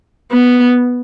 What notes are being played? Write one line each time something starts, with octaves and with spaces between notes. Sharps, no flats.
B3